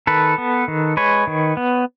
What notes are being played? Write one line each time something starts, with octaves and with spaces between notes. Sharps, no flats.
D#3 A4 B4
B3
D#3
G#3 B4 C#5
D#3
B3